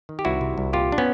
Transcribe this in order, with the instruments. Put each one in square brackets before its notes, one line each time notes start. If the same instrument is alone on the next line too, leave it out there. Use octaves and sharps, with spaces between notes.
[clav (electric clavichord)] D#3
G4
C2 E4 F#4
C3
C2
A#2 F4 G4
D4
B3 C#4